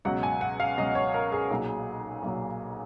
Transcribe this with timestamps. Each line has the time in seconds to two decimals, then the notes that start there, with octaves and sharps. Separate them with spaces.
0.05 C#2 B2 F#3 F#5
0.23 G#5
0.41 F#5
0.60 F5
0.77 C#2 B2 F#3 D#5
0.95 C#5
1.14 A#4
1.32 G#4
1.51 B1 A#2 F#3
2.23 B1 A#2 F#3